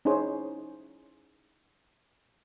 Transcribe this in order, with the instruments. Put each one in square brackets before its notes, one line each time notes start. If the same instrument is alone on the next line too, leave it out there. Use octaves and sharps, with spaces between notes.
[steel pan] C#4 D#4 E4 G#4 C5 C#5